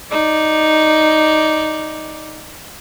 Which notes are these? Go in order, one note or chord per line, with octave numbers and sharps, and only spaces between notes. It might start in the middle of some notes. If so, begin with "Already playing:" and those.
D#4 D5